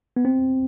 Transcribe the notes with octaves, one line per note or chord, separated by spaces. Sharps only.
B3
C4